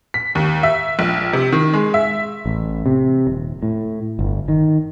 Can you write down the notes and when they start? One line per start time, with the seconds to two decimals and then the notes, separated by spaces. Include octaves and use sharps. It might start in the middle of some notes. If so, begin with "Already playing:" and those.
0.14 B6
0.35 D#2
0.63 E5
0.99 A#1
1.33 C3
1.52 D#3
1.74 G#3
1.94 E5
2.46 A1
2.86 C3
3.27 D#1
3.63 A2
4.19 G1
4.48 D#3